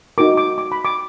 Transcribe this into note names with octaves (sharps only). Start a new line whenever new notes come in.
D#4 F#4 A#4 D6
D6
D6
B5
D6